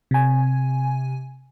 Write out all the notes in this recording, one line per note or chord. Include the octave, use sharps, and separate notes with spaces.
C3 G#5